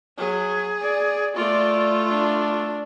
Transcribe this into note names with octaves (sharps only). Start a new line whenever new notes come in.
F#3 G#4
D5
A3 F4 D5
D4